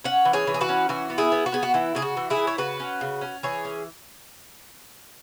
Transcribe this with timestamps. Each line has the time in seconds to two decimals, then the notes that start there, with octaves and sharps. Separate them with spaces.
0.04 C#4 C#5 F#5
0.25 E3
0.33 G#4 C#5
0.47 E3
0.54 G#4
0.61 F#4 B4
0.69 C#4
0.89 E3 F#4
1.10 B3
1.18 E4 G#4
1.32 B3
1.46 F#4
1.52 B3 G#4
1.63 F#4
1.74 E3 E4
1.95 C#3 G#4
2.02 F#4
2.17 E3
2.30 E4 G#4
2.37 E3
2.47 C#5
2.58 C#3 F#4 B4
2.80 C#4
3.01 C#3
3.21 C#4
3.43 E3 G#4 C#5
3.65 C#4